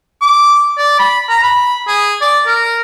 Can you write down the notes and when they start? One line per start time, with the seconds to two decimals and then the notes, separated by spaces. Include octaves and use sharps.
0.22 D6
0.77 D5
0.99 B5
1.29 A#5
1.43 B5
1.87 G#4
2.21 D5
2.47 A#4